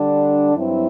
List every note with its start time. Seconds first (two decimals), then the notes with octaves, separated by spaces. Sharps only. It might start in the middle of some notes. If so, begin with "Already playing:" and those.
Already playing: D3 G3 D4
0.54 G2 F#3 C4 E4